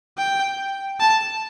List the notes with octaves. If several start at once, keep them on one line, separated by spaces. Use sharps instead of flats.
G5
A5